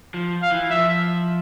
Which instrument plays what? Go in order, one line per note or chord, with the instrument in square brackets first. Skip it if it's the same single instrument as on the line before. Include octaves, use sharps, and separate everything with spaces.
[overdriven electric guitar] F3
[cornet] F5
[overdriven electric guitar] E3
[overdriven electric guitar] F3 [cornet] E5